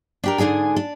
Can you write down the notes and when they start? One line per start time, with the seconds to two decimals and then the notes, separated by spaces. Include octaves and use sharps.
0.24 D4 G4 A#4
0.38 G#2 D3 D4 G#4 G#5
0.76 D4